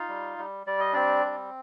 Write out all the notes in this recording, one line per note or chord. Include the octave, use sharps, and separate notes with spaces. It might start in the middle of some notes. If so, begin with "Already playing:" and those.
Already playing: D#4 F4 F5
G3
G3
G3 D5
D#5
C4 D4 D5
G3